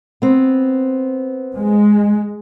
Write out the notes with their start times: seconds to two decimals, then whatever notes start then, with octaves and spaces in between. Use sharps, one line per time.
0.22 B3 C4
1.55 G#3